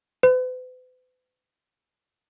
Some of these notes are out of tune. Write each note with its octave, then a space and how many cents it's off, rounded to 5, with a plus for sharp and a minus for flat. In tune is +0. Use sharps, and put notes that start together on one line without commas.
B4 +45